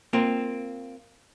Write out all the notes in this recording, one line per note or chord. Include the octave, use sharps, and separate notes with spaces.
A#3 C4 F4